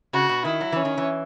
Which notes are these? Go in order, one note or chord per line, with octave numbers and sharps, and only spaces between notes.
C#3 F#4
B2
D#3 E4
F#3
E3 C#4
D#3
E3